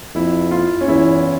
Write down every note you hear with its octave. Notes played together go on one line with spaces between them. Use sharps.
F2 E4
F4
C#4
E2 E4